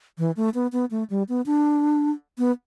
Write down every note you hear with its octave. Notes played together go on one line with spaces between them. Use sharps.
E3
A3
B3
B3
A3
G3
B3
D4
B3